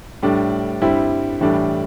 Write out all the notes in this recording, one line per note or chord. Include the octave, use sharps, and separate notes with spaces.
A2 G3 D4
G2 G3 C4 E4
A2 E3 G3 D4